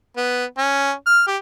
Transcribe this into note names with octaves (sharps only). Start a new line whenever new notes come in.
B3
C#4
F6
G4